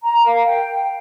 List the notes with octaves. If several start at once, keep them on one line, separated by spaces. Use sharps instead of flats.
A#5
A#4 F5
G5